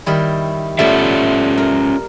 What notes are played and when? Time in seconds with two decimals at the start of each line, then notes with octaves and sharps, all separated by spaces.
0.06 D#3 G3 E4
0.79 G3 A3 B3 C#4 F4 E5
1.58 A#4